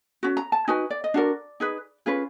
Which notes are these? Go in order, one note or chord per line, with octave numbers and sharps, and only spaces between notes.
C#4 F#4
A#5
A5
D#4 F#4 B4 G#5
D5
D#5
D4 F#4 A#4 D5
D#4 G#4 B4
C#4 F4 G#4 B4